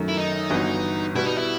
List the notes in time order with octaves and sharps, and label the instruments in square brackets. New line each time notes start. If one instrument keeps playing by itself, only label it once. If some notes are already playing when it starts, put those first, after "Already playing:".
Already playing: [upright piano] F#2 D#3 A3
[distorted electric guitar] E4
D#4
[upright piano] G1 G2 E3 B3 F#4
[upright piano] B2 G3 B3 [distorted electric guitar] E4
[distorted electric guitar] D#4
E4